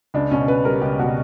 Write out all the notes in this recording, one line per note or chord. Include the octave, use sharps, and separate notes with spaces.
C#2 D4
B2 C#4
C#2 B4
G3 A#4
C#2 G4
B2 F#4